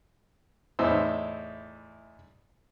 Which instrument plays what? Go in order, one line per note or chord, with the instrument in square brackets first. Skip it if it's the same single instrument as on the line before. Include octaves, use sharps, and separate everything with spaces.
[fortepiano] E2 A2 D#4 E4 C5 E6